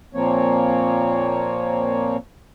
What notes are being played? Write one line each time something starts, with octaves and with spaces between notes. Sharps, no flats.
A#2 F3 A#3 C4 C#5